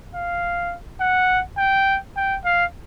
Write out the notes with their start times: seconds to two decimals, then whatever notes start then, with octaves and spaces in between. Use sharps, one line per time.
0.15 F5
1.01 F#5
1.58 G5
2.16 G5
2.45 F5